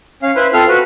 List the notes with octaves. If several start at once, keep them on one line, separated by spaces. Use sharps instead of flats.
C#4 F5
E4 B4 C5
C4 F4 A4 F5 F6
F#4 B4